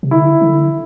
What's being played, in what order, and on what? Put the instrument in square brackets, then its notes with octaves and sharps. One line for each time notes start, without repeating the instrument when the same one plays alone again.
[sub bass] C3
[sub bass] D3 [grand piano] E4
[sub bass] E3
D3